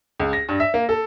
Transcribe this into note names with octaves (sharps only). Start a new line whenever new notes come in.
C#2
A#6
G2
E5
A#3
A4